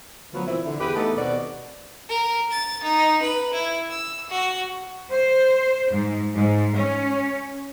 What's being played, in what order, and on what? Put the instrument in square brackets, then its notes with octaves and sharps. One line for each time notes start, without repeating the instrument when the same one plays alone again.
[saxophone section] D2 F3 F#3 B3 B4
A#2 E3 C4 E4
D3
E2 G4 G#4 B4
A3 B3 D#4 A4
D#2 B2 C4 F#4 D5
[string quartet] A#4
A6
D#4
B4
E4
E6
F#4
[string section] C5
G#2
G#2
C#4